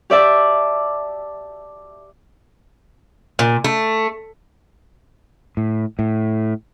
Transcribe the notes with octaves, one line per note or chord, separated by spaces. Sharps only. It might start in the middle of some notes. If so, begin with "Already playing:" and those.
G4 D5 E5 A5
A#2
A3
A2
A2